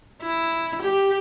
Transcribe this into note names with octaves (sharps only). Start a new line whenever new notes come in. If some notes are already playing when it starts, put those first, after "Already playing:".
E4
G4